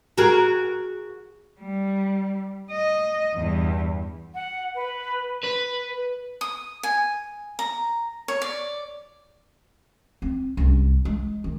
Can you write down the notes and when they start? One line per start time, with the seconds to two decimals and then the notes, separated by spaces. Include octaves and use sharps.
0.18 F#4 G#4 A#4
1.60 G3
2.71 D#5
3.35 E2 G2
4.35 F#5
4.75 B4
5.43 B4
6.41 D#6
6.83 G#5
7.59 A#5
8.28 C#5
8.42 D5
10.22 C4
10.57 C2 F#2
11.05 G#3
11.44 D#3